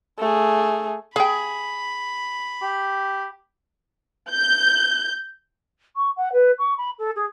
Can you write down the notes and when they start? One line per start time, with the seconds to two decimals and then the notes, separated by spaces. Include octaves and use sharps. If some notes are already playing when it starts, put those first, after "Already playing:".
0.19 A3 G#4
1.16 G#4 F5 G5 B5
2.62 G4
4.30 G6
5.96 C#6
6.16 F#5
6.32 B4
6.58 C#6
6.77 B5
6.98 A4
7.15 G#4